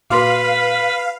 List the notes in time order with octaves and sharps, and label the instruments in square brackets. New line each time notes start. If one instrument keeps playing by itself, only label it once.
[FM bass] A#2 [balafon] F#4 C6 [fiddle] B4 [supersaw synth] F5